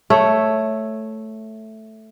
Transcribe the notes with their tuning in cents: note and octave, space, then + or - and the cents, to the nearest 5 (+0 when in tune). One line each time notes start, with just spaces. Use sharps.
A3 +0 C#5 +0